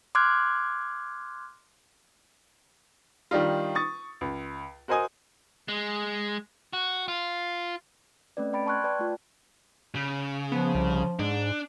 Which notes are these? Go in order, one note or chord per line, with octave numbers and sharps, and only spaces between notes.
C6 D6 F6 F#6 G#6
D#3 G3 D4 D#4 F4
C#6 D#6 A6
C#2
F#4 A#4 C5 D#5 G#5 D#6
G#3
F#4
F4
A3 C4 C#4 B4 D5
D5 G5 B5 A6 D7
A5 C6 C#6 F6 F#6 G#6
B4 D5 G5 A5
A3 F4
C#3
F3 B3
C2
G#2 D4